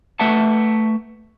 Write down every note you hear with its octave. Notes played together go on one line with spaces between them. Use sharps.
A3 B4 E5 F#5 A5